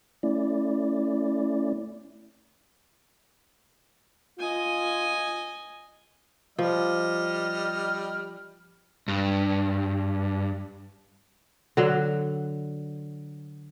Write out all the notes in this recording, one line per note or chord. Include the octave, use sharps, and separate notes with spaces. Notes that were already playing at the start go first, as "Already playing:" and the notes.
A3 C#4 E4 D5
F4 D#5 G#5
F3 G3 D#5 F6
G2
D3 F#3